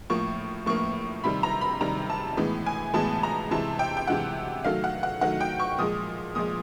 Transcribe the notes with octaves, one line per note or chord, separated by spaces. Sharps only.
A2 F3 A#3 C#6
A2 F3 A#3 C#6
C3 D#3 G3 B5
A#5
B5
C3 D#3 G3 A#5
A5
A2 E3 G#3 B3
G#5
A2 E3 G#3 B3 A5
A#5
C3 E3 G#3 A5
G5
G5
C3 E3 G#3 F#5
D#3 F#3 A3 F5
F#5
F#5
D#3 F#3 A3 F#5
G5
C#6
A#2 F3 G#3 D#6
A#2 F3 G#3 D#6